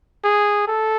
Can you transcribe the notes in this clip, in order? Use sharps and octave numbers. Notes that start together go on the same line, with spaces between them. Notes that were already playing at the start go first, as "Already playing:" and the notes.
G#4
A4